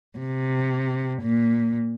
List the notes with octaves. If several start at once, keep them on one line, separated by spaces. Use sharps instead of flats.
C3
A#2